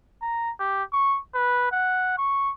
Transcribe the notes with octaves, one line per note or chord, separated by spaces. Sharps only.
A#5
G4
C#6
B4
F#5
C#6